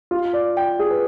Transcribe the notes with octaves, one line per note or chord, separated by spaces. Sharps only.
F4
D5
G5
G#4
B4